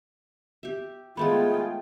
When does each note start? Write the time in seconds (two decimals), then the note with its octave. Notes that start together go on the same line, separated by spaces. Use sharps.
0.63 G4 E5
1.17 G#3 A3 B3 F4 G#4 G5 B5